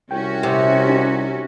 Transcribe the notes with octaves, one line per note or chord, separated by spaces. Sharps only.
C2 C#4 F#4 G5
C3 G4
D#4 G4